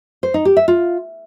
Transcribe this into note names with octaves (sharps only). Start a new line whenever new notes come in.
C5
D#4
G4
E5
F4